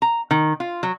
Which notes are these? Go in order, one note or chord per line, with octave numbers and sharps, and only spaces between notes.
A#5
D#3
F4
F#3